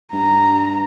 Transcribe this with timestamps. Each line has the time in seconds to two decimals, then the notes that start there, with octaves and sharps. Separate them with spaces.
0.13 G2 A#5